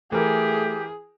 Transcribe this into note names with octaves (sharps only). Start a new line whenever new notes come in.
E3 A3 G4 G#4 A#4